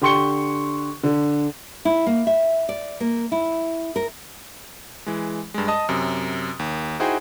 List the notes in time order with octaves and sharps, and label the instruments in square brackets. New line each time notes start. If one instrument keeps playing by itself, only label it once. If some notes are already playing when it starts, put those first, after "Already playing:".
[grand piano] D3 G4 C6 C#6 C#7 G7
D3
[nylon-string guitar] E4
A#3
E5
D5
A#3
E4
A#4
[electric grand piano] E3 G#3
G2 G#3
D#5 A5 D#6
F#2 C3
D#2
D#4 E4 F#4 G#4 C5 G5